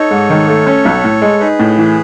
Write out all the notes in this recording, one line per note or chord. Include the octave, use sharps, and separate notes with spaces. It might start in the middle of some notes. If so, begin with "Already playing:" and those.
Already playing: D#4 A4 C#5
G#2
D#3
A3
C#4
B1
A2
G#3
D#4 G#4 B4
A2
E3